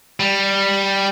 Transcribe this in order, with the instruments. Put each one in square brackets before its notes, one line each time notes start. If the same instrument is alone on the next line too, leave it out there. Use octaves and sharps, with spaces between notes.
[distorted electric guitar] G3